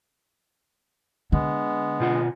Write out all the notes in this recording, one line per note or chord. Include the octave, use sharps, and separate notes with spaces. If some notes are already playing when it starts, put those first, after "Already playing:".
D3 G#3 B3
B2 F4 F#5